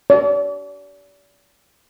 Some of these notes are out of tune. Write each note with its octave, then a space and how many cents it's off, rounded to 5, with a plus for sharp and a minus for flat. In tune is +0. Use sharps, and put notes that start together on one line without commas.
D5 -40